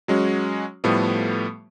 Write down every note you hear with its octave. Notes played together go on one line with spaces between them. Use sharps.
F#3 G#3 C#4 F#4
A2 F3 G3 A3 B3